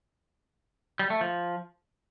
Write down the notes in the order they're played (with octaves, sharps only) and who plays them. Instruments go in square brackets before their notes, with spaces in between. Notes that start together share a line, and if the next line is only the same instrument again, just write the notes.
[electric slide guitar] G3
A3
F3